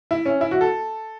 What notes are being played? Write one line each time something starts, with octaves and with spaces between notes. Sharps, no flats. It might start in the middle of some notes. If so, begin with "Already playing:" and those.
E4
C#4
E4
F#4
A4